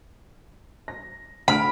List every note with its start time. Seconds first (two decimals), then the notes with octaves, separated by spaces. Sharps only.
0.88 A#6
1.48 D2 B5 F6 D7